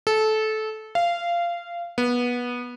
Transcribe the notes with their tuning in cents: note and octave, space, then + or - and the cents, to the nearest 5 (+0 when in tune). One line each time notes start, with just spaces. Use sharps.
A4 -20
F5 -20
B3 -20